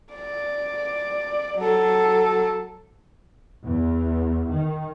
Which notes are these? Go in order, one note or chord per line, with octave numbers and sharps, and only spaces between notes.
D5
F#3 A4
E2
D#3